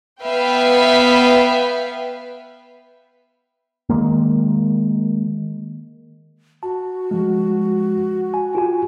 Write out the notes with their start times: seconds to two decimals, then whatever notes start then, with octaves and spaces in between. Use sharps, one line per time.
0.22 B3 B4 E5 F5 G5
3.89 D#3 E3 G#3 A#3
6.63 F#4 A5
7.11 F3 G#3
8.34 G#5
8.55 F4 G4 G#5